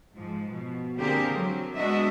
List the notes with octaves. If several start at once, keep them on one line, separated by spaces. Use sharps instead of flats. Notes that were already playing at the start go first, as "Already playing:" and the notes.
G#2 F3
B2
D3 A#3 C4 G4 G#4 A#4
F#3
G#3 B3 D4 F#4 D#5 E5